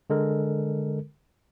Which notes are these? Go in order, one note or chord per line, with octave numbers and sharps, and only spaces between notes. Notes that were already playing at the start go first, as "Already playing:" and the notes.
D3 G#3 A4 A#4